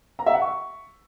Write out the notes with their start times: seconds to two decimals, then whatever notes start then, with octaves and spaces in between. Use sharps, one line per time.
0.19 A#5
0.26 E5
0.34 F#5
0.41 C#6